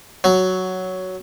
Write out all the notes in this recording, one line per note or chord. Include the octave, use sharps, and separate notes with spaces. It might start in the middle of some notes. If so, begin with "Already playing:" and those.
F#3